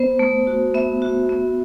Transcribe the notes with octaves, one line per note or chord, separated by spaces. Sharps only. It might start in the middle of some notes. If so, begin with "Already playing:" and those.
Already playing: B3 C5
A3
F#4
B3 E5
F#4
B3